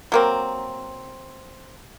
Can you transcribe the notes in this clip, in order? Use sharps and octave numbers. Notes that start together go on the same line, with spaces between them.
F#3 A#3 C4